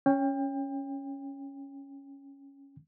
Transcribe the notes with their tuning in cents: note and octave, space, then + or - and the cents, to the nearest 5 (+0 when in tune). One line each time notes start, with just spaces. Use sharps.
C#4 +0 G5 +30